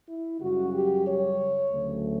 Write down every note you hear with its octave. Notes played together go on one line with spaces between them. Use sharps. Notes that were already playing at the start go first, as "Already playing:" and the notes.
E4
F#2 C#3 G3 F#4
G4
C#5
D2 C#3 F#3 A3